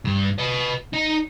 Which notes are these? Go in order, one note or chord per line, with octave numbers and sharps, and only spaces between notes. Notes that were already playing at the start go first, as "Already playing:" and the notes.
G2
B4 D#5
D#4